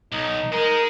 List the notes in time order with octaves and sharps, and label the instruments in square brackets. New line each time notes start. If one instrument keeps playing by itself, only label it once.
[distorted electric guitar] B1 [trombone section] D#4
[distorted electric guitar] G#3 [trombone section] D#4 [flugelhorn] A#4